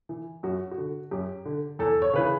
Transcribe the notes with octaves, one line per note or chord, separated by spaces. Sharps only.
E3
F#2 F#4
F#4
D3
F#2 G4
D3
E2 A4
C#5
C#3 E3 B4